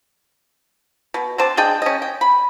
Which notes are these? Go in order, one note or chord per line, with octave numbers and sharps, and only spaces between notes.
B2
C4 D4 C5 A5
D4 G#4 D#5 G5
C#4 D#5
G5
B5